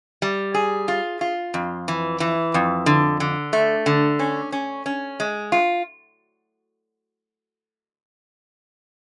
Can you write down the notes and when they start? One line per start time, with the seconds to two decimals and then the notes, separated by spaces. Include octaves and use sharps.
0.22 G3
0.54 G#4
0.88 F4
1.21 F4
1.54 F2
1.88 E3
2.20 E3
2.54 F2
2.86 D3
3.20 D3
3.53 A3
3.86 D3
4.19 C#4
4.52 C#4
4.86 C#4
5.20 G#3
5.52 F4